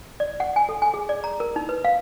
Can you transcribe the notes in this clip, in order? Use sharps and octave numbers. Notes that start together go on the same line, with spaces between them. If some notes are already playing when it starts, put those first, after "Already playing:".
D5
F#5
G#5
A4
G#5
G#4
D5
A#5
A#4
D#4
B4
F5